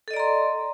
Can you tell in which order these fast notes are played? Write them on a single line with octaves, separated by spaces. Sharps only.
A4 D#5 D5 A#5 C6